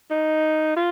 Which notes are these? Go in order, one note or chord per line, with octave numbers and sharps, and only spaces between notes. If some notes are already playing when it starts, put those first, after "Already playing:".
D#4
F4